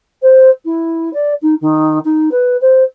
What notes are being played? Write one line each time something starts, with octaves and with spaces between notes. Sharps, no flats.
C5
E4
D5
D#4
D#3
D#4
B4
C5